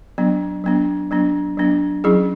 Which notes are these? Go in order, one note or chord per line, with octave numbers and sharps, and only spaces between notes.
F#3 B3 D4
F#3 B3 D4
F#3 B3 D4
F#3 B3 D4
F#3 C#4 E4 G#4